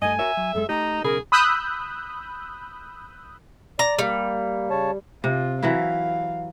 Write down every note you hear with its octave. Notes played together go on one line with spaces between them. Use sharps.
G2 A3 D#5 G#5
F#4 A#4 C#5 E5
F#3
F#2 G#3 A4
A3 D#4 G4 A#5
B1 C#3 G#4 A#4 B5
B5 D#6 E6 F#6 G6
D5 A#5
G3 A#3
C#3 C#5 A5
C3 F4
E3 F#3 E4 F5